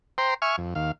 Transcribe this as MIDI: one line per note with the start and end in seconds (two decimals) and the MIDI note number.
0.18 0.34 72
0.18 0.34 79
0.18 0.34 82
0.18 0.34 84
0.42 0.56 76
0.42 0.56 80
0.42 0.56 85
0.42 0.56 89
0.58 0.74 41
0.75 0.92 39
0.75 0.92 77